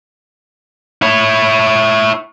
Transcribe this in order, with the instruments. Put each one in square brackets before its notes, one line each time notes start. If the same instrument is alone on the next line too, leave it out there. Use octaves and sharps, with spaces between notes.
[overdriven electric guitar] E4 C#5